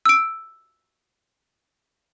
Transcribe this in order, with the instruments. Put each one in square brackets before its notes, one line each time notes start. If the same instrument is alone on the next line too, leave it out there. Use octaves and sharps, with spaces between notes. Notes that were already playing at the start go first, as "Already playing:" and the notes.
[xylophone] E6 D7